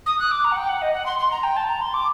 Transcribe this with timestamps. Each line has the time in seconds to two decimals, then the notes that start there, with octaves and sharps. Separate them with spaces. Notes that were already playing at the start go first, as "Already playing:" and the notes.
0.06 D#6
0.19 F#6
0.31 D6
0.44 A#5
0.51 F#5
0.56 G5
0.68 F#5
0.81 D#5
0.93 F#5
1.05 C6
1.18 C6
1.31 A#5
1.43 G5
1.56 A5
1.69 A#5
1.81 C6
1.93 D6